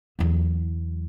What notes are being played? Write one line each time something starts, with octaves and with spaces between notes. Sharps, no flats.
E2 F#3